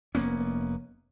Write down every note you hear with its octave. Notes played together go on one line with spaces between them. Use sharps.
F1 A#3 B3 C#4